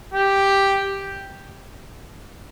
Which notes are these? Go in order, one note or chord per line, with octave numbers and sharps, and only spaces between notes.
G4